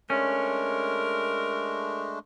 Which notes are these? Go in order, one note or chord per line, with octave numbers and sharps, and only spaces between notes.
G#3 A3 C#4 D4 A#4